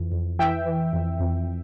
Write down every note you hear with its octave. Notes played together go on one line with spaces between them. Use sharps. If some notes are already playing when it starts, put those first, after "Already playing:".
Already playing: F2 E3
F2
E3 E5 G5
E3
F2
F2